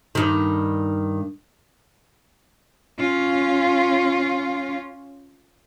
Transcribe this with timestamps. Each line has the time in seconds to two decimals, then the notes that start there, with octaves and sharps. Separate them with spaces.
0.15 G2 D#3
2.99 C#4 F4